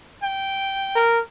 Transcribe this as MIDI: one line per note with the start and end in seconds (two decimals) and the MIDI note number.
0.23 1.01 79
0.96 1.20 70